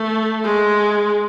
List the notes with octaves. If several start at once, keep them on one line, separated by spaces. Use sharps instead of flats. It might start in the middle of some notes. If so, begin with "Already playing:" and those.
Already playing: A3
G#3